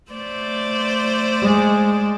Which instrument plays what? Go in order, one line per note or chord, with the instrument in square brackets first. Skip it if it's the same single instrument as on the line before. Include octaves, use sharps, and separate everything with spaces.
[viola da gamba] A3 C5 D5
[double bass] G#3